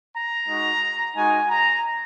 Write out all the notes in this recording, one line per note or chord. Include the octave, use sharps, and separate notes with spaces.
A#5
G#3 D#4 F#4
G#3 D#4 F#4 G#5
A#5